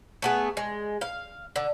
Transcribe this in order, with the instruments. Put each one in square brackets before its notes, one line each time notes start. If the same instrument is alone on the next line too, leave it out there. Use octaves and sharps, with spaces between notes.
[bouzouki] A3 B3 G#4
G#3
F5
D3